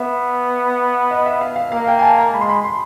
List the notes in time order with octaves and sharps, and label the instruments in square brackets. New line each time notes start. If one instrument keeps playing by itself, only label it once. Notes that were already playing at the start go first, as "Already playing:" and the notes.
Already playing: [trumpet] B3 [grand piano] E5
[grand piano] D#5
E5
F5
F5
[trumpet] A#3 [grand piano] F5
[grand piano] G5
G#5
A5
A#5
[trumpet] G#3 [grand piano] B5
[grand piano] C6
B5
C6